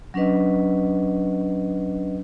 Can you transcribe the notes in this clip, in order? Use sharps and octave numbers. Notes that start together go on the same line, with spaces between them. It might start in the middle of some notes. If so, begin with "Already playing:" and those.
F#3 C#4 D4 B4 D#5